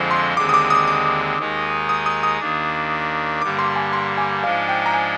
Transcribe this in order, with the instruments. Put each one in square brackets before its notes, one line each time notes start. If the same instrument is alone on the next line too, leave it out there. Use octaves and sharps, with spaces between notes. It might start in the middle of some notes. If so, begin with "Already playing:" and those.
Already playing: [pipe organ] F2 D3 F3 G#3 C4
[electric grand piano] C6
[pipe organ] D#2 D3 G#3 C4 [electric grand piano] D6
[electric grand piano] D#6
D6
D#6
D6
[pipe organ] D#2 D#3 G#3 D#4
[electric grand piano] D#6
D#6
D#6
[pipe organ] D#2 D#3 A#3 D4
[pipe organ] G2 D3 G3 A#3 [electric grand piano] D6
[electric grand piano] C6
G#5
C6
G#5
[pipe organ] G#2 F3 G#3 D4 [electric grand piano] F5
[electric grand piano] G5
A#5
G#5